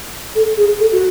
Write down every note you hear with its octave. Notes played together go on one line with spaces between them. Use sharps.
A4
G#4
A4
F#4